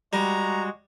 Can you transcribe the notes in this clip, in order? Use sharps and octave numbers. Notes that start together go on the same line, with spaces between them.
G3 G#3 F#4 A#5